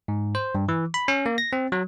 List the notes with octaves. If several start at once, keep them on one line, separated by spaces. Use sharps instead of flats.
G#2
C5
G2
E3
B5
C#4
A#3
A#6
C4
F#3